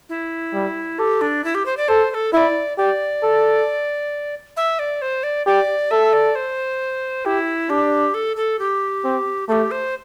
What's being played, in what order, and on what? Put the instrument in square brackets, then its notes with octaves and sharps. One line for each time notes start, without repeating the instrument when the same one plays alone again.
[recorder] E4
[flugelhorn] G3
[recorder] G4 [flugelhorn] A4
[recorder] D4
E4
G4
C5
D5
[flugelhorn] A4 [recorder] C5
[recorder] C5
A4
[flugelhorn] E4 [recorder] D5 E5
[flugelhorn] G4 [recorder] D5
[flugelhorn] A4
[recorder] E5
D5
C5
D5
[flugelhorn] G4 [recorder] D5
[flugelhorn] A4 [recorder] E5
[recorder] D5
C5
[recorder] E4 [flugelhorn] G4
[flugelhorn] D4 [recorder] G4
[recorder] A4
A4
G4
[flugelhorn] C4
[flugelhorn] A3 [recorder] G4 A4
[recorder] C5